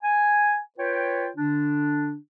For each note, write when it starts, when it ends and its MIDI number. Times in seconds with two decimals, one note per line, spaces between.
0.03 0.58 80
0.79 1.28 65
0.79 1.28 71
0.79 1.28 73
0.79 1.28 79
1.36 2.15 50
1.36 2.15 62